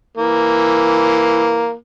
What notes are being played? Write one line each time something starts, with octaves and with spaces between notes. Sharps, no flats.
E3 A#3